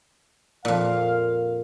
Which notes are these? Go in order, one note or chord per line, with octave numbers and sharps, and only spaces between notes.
F2 A#2 F5